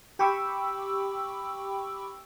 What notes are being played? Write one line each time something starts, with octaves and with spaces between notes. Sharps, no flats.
G4 G5 B5 C#6 D6 E6